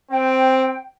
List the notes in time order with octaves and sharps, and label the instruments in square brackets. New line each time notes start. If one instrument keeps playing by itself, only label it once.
[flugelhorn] C4 [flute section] G5